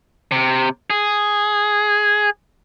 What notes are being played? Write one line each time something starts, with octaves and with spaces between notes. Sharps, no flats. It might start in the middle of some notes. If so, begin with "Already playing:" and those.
C3
G#4